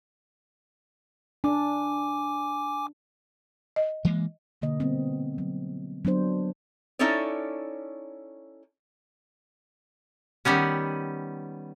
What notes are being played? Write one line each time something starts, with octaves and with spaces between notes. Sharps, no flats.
D4 G#5 D6
D#5
E3 G#3 A#3
B2 D3 A#3 D#5
G3 B3 C4
F#3
F#3 B3 D4 C5
C#4 D#4 E4 A4 C#5 D5
D#3 G3 B3 C#4